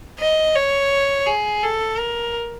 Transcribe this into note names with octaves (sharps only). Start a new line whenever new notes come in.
D#5
C#5
G#4
A4
A#4